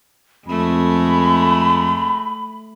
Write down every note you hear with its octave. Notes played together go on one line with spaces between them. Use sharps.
F2 G#3 A3 B5